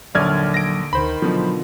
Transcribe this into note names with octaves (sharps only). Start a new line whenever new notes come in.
A#1 D#2 D3 F#3 C#5 D5 F6 G#6
A#6 D7
D2 D#3 C5 B5
B2 D3 F3 F#3